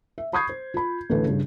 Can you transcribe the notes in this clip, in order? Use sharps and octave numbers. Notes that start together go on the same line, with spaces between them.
E5
B5 C#6 D#6 G6 G#6 C7
C5
F4 B5
A1 D2 A4 B4
G2 C#3